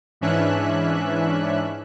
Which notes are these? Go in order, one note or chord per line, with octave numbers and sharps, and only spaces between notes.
G#2 E3 C#4 D4 E5 F#6